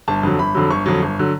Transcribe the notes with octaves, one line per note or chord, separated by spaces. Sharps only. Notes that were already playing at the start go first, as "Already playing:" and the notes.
G1 A5
F2 D3 F#3
G1 B5
F2 D3 F#3
G1 C#6
F2 D3 F#3
G1
D3 F#3